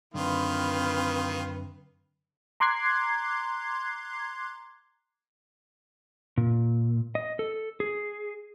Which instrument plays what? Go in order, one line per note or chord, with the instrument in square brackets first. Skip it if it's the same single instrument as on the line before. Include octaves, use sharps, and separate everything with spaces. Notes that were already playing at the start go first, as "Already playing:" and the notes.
[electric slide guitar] F#2 D3 [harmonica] D#3 F4 [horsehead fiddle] C4 B4
[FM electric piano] A#5 C6 D6 F#6 G#6 C7
[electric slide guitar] A#2
D#5
A4
G#4